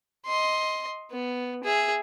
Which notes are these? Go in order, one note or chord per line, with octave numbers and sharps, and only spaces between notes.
D#5 C6
B3
G#4 E5